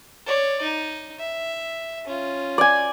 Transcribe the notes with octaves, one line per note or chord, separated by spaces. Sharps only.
C#5 D5
D#4
E5
C#4 F4
D5 G#5